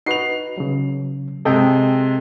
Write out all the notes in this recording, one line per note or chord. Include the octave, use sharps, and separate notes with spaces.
D#4 F#4 B4 C7 F7
C#3 F#3
C3 G#3 A4 D#5 G5